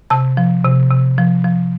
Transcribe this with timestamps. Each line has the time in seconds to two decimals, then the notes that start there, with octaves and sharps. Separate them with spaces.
0.10 C3 A5
0.37 F3
0.64 C3
0.91 C3
1.18 F3
1.45 F3